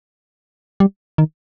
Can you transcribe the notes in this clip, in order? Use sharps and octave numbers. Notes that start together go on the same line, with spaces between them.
G3
D#3